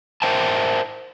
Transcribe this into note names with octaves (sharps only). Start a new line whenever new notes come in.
A#4 C5 E5 G5 A5